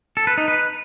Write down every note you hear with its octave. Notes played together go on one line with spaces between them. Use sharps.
A4
B4
D#4
B4